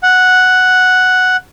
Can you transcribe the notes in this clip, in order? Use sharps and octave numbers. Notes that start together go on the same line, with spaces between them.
F#5